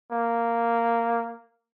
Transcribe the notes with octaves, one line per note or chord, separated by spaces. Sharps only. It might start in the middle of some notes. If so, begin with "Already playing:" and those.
A#3